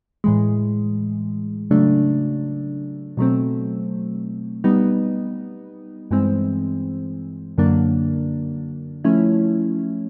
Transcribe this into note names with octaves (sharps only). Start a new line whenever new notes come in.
A2 E3 G#3
C#3 F#3 A3 D4
B2 F#3 A3 C4
G3 B3 D#4
G2 E3 G#3 C4
F#2 D3 F#3 A#3 D4
F3 A3 C#4 E4